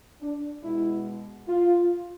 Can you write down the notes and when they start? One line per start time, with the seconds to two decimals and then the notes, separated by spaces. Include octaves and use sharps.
0.21 D4
0.63 B2 G#3 E4
1.47 F4